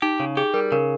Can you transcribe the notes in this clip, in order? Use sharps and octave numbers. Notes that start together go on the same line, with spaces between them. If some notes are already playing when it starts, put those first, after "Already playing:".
D#4 G4
C#3
G4 G#4
G3 A#4
C#3 A#4